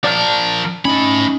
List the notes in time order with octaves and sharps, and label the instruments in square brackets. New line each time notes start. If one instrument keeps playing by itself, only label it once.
[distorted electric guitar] F3 A#4 [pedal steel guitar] D5 A5 F6
[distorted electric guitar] A3 B5 [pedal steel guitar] C#4 D#4